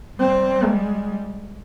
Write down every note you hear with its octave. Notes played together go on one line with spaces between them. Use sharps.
G3 C4
G#3